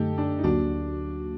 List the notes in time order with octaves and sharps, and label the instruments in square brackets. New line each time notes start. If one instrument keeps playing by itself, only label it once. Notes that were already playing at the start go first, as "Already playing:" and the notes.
Already playing: [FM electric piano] F#2 D3 A3 [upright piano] D#4 G4 A4
[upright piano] D4
D#4
[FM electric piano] D2 D3 F#3 A#3 F#4 [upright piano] D4